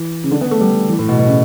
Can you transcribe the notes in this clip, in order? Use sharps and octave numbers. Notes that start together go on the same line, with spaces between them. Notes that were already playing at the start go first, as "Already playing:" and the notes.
Already playing: E3
C#3
D3
B3
A3
G3
E3
A2
B2
B2
C#3